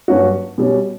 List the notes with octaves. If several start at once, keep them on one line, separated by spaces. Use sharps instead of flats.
G2 F#3 A#3 C#4 F#4
B2 G3 C#4